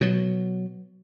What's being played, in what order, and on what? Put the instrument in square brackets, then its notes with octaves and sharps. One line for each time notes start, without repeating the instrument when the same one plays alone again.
[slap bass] B2 F#3